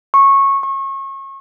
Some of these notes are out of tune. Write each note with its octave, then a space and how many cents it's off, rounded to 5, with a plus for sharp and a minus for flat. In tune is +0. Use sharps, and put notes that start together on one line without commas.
C#6 -15
C#6 -30